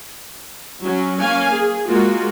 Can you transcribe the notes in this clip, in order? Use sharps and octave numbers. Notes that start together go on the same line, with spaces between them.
F#3 C#4
A#3 C#4 F5 G#5
G#4
G#3 A#3 F4 F#4